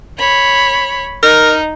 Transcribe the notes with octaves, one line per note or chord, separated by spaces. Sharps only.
C#5 B5
D#4 A#4